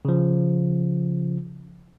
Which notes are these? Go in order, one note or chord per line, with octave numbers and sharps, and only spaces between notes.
C#3 F3